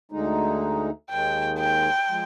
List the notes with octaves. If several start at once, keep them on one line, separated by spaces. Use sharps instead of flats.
D2 D3 G#3 D#4
D#2 D#3 G#3 G5
G5
F3 G#3